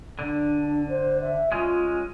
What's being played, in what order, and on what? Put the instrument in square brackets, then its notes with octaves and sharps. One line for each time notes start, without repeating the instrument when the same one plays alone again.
[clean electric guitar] D3 [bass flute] D4
[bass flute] C5
E5
[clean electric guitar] G#3 C#4 [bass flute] F4